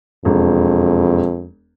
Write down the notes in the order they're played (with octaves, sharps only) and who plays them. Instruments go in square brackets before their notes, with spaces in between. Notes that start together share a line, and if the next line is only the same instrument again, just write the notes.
[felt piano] E1 [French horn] F2